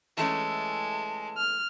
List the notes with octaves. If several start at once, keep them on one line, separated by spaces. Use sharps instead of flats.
E3 G#3 A3 C#4 A5
F6